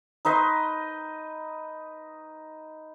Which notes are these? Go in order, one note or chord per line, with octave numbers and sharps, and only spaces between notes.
D#4 B4 D#5 C6